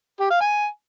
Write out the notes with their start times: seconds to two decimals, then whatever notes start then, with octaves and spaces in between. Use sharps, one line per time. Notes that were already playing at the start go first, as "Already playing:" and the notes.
0.20 G4
0.30 F5
0.41 G#5